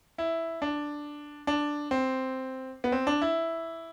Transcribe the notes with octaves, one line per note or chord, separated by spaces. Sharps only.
E4
D4
D4
C4
B3
C4
D4
E4